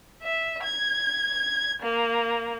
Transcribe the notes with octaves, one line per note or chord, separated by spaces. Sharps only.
E5
G#6
A#3